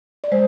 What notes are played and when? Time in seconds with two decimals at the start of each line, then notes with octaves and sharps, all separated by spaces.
0.24 D5
0.32 G#3 C5